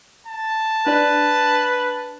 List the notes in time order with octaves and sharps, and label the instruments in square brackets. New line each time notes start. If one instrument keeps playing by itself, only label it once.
[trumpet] A5
[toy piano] D4 D5 [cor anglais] B4